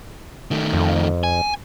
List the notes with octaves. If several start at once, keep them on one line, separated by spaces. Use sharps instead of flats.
D#3 A3
F2
G#5